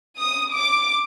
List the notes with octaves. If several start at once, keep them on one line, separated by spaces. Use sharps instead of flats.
D#6
D6